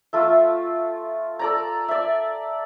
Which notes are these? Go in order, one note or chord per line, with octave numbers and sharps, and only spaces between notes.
A3 F4 A4 E5
A4 D5 A#5
D5 E5